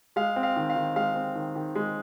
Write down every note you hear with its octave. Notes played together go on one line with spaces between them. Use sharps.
G#3 F5
C4
F5
D#3
F5
D#3
G#3 F5
C4
D#3
D#3
G#3